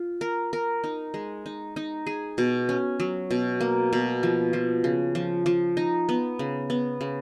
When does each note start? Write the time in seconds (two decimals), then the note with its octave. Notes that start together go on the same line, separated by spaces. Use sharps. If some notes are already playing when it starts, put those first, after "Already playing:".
Already playing: F4
0.21 A#4
0.53 A#4
0.84 D#4
1.14 G#3
1.46 D#4
1.76 D#4
2.07 G#4
2.38 B2
2.69 C#4
3.00 F#3
3.31 B2
3.61 A#3
3.93 B2
4.23 F3
4.53 F3
4.84 C#3
5.15 F3
5.46 F3
5.77 D#4
6.09 B3
6.39 C#3
6.70 B3
7.01 C#3